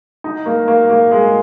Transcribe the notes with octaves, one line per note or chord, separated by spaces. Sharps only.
D#4
A#3
A#3
A#3
G#3